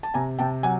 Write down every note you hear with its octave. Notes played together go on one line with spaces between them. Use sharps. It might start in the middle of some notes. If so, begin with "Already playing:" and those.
A5
C3 G#5 A#5
C3 G5 A5
F#3 F#5 G#5